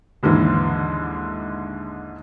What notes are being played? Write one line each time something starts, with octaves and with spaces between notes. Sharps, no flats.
D#2 G#2 D3 E3